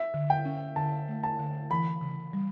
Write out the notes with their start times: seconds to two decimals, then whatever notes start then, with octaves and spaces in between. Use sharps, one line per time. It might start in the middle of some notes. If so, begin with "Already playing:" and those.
Already playing: E5
0.14 D3
0.30 G5
0.45 C#4
0.76 D3 A5
1.08 A3
1.23 A5
1.39 D3
1.70 E3 B5
2.01 C#3
2.33 G3